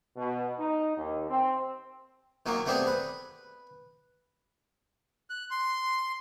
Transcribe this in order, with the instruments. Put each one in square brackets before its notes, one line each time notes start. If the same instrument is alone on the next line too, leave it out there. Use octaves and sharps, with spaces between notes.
[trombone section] B2
D#4
D#2
C4
[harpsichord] D#3 F#3 A#3 C#4
A3 B3 C4 D4 G4 G#4
B4
[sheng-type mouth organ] F#6
C6